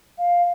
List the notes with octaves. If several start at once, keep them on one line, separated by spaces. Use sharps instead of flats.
F5